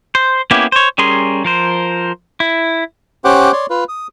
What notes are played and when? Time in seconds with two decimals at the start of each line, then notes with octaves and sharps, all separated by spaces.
0.15 C5
0.51 A#3 B3 C#4 E4 G4
0.72 C5 C#5
0.98 G3 C#4 G#4 A#4 C6
1.44 F3 A#4 C5
2.40 E4
3.25 C#4 G4 C5 F#5 D6
3.52 C#5 D5 C6
3.70 F4 B4
3.89 D#6